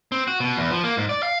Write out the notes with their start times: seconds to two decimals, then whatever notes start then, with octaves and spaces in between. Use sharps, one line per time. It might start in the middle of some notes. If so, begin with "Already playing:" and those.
0.12 C4
0.28 F#4
0.40 B2
0.57 E2
0.71 F3
0.84 A#3
0.97 G#2
1.09 D5
1.23 F5